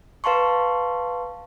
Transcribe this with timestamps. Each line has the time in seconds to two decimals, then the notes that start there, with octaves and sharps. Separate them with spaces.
0.24 B4 F5 A5 C6 C#6